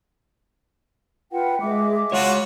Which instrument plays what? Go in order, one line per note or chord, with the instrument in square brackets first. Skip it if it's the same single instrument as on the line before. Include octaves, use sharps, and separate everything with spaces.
[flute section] F4 B4 F#5 [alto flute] G5
[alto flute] G#3 [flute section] D#5 E5 D6
[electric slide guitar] G#3 C#5 [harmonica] F4 F#4 [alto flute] F#5